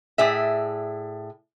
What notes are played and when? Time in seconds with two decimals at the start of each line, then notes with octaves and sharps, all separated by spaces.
0.18 A2 G#4 D5 E5